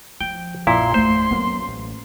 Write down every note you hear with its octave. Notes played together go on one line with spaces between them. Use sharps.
F3 G5
A#1 F#2 A#2 E4 C6
A3 D4 C5
F#3 A#3 B3 C#4
A1